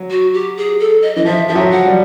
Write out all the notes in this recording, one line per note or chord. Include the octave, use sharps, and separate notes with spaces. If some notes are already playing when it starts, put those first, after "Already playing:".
Already playing: F#3
F#4
G4
G#4
A4
D#5
E3 D#5
F3 E5
F3 E5
F#3
F#5
G3